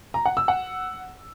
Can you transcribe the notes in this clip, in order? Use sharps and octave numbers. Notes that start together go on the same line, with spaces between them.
A#5
F#5
E6
F#5